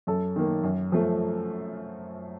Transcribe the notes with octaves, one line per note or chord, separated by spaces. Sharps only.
F#2 A4
D#3 A#3
F#2
F3 A3